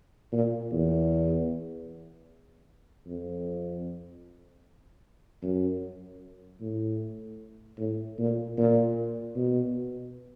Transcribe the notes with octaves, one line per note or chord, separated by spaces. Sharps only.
A#2
E2
F2
F#2
A2
A2
A#2
A#2
B2